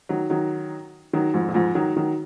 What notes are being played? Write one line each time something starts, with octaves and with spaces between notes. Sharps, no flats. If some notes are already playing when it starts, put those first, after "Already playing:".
D#3 F#3
D#3 F#3
D#3 F#3
F2 G#2
A#2
F2 G#2
D#3 F#3
D#3 F#3